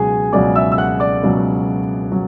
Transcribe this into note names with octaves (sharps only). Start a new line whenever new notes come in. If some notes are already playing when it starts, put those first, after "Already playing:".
Already playing: C#2 B2 F#3 F#4 G#4 G#5
C#2 B2 F#3 D5 D6
E5 E6
E6
F#5 F#6
D5 D6
C#2 B2 F#3
F#3